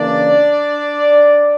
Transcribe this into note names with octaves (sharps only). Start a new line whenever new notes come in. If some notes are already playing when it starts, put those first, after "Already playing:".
Already playing: C#3 E3 A#3 D4 D5